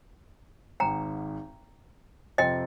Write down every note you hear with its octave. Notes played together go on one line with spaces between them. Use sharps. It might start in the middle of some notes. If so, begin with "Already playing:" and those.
G#1 G#2 D#3 G5 A#5
F2 C3 F3 C4 D#5 G5